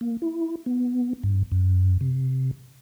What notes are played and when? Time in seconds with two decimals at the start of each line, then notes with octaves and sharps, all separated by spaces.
0.01 A#3
0.22 E4
0.66 B3
1.23 G2
1.52 F#2
2.01 C3